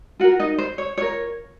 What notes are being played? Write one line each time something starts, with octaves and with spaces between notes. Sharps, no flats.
F4 F#4 A#4 F#5
D#4 D#5
C5
C#5
F4 A#4 C#5